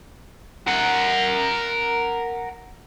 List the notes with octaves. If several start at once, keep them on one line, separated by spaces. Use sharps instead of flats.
A#4 F#5